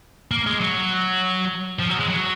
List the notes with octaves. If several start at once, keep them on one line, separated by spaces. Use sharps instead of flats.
A#3
G#3
F#3
F3
F#3
G#3
F#3